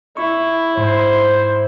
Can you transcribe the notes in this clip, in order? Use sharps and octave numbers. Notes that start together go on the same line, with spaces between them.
E4 C#6
G#2 C5